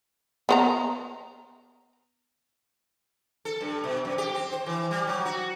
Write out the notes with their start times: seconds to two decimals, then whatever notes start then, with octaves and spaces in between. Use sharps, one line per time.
0.49 B3 B4 A#5
3.45 A4
3.61 G2
3.84 B2
4.05 F#2
4.18 G4
4.34 C4
4.53 C5
4.66 E3
4.91 G3
5.07 F#3
5.25 F#4